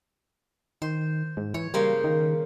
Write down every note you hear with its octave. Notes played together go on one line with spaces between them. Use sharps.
D#3 C5
G#2
E3 C#5
C#3 G3 A#3 C5
D#3